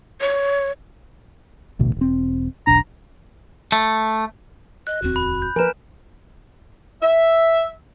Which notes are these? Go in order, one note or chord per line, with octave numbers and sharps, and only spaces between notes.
C#5
A1 D2 B2
E1 C4
E1 B1 D4 A#5
A3
D#5 F#6
D1 E2 C4 F#4
B5
G6
F3 A#4 B4 G#5 E7
E5